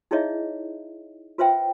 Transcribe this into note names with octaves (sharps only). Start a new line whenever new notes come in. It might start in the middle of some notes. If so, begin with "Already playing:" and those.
D#4 E4 G#4 C#5 D#5 E5
F4 B4 C5 E5 G5